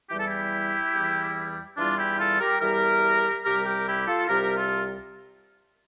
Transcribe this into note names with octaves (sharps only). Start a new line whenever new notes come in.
E2 E3 G3 G4
A4
E4 G4
E2 E3 G3
E2 E3 G3 D4 F4
E4 G4
F4 A4
G4 A#4
E2 E3 G3 G4 A#4
C2 C3 G3 G4 A#4
G4 A#4
E4 G4
F4 A4
C2 C3 G3 G4 A#4
F4 A4